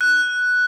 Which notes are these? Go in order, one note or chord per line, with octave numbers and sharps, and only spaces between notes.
F#6